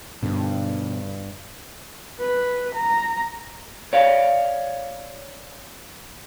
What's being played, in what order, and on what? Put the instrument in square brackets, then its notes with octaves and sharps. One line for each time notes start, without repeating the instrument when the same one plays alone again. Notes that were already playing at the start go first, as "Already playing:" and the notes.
[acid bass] G2 [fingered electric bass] B2 D3
[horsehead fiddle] B4
A#5
[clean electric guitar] C#5 D5 F5